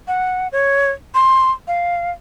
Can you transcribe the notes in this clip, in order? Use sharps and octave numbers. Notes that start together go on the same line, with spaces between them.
F#5
C#5
C6
F5